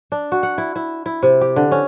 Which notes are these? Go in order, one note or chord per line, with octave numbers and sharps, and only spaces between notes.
D4
F#4
F#5
E4
E4
E4
C3
G4
D3
C#4